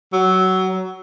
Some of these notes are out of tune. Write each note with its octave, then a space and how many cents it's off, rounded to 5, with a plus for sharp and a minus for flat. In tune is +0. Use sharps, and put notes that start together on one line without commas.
F#3 +20